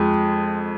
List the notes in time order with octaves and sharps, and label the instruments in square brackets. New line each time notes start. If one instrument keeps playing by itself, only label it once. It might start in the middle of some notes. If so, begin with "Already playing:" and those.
Already playing: [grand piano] F2 F3 G#3